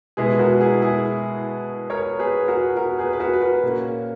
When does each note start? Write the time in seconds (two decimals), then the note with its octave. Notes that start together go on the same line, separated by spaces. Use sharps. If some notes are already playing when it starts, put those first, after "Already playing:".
0.17 B2 G#3 B3 E4 G#4
0.39 F#4 A#4
0.61 E4 G#4
0.82 E4 G#4
1.90 A#4 C#5
2.19 G#4 B4
2.48 F#4 A#4
2.77 F#4 A#4
2.99 G#4 B4
3.13 B4
3.20 F#4 A#4
3.34 B4
3.42 F#4 A#4
3.63 A#2 A#3 C#4